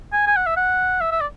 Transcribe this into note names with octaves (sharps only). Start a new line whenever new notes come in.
G#5
G#5
F#5
E5
F#5
E5
E5
D5